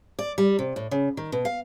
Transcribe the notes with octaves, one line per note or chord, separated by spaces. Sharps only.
D5
G3
C3
A2
C#3
D#3
B2
F5